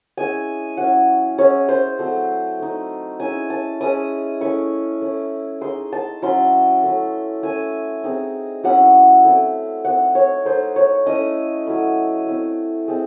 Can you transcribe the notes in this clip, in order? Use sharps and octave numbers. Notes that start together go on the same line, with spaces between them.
G#3 C#4 E4 G#5
F#3 C#4 E4 F#5
G#3 C#4 E4 C#5
C5
F#3 A3 C4
A3 D#4
G#3 C#4 E4 G#5
A5
G#3 C#4 E4 D#6
A3 C#4 E4 C#6
A3 C#4 E4
G#3 D#4 C6
A5
F#3 C#4 E4 C6
A3 C#4 E4
A3 C#4 E4 G#5
G#3 C4 D#4
F#3 C#4 E4 F#5
A3 C4 E4
A3 C4 D#4 F#5
C#5
A3 D#4 C5
C#5
A3 C#4 E4 D#5
F#3 A3 C#4 E4
A3 C4 E4
G#3 C4